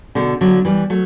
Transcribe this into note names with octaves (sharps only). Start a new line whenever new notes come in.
B2 D3
D3 F#3
E3 G3
F#3 A3